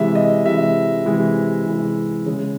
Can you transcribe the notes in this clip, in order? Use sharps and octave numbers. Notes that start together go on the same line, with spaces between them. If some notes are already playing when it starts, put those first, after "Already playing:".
Already playing: C3 E3 G#3 E5
D#5
C3 E3 G#3 E5
C3 E3 G#3
C3 E3 G#3
C#3 G#3